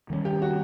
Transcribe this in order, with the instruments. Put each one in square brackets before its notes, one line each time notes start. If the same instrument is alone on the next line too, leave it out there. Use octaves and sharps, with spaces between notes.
[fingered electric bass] D#3 G3 A#3 C#4
[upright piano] G4
F#4